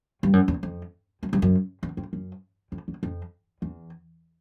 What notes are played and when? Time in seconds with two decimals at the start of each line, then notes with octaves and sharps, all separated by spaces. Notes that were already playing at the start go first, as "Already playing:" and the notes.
0.23 G2
0.33 F#2
0.48 E2
0.63 F2
1.23 F#2
1.33 G2
1.42 F#2
1.83 E2
1.97 F2
2.13 F#2
2.72 F2
2.88 E2
3.03 F2
3.62 E2